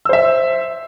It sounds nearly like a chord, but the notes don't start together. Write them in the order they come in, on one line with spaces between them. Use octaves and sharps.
E6 C5 E5